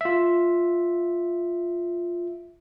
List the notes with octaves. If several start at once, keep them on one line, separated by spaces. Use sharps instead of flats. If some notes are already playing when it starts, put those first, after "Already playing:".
F4 E5